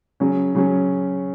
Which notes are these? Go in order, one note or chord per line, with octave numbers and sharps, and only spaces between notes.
C#3 F#3 C#4
C#3 F#3 C#4